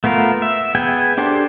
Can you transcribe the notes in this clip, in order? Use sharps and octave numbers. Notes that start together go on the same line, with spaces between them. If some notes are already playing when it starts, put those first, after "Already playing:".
A3 B3 F4 A#4
E5
B3 G#4 G5 G#5
D4 G4 A4 C5